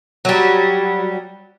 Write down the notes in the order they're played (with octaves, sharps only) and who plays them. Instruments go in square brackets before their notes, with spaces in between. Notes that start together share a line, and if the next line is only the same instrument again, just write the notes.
[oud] F#3 G3